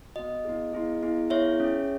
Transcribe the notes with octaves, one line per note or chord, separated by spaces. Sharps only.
B3 F#4 D#5
B3 E4 G#4
B3 E4 G#4
B3 E4 G#4
B3 E4 G#4 C#5 E5
C#4 G#4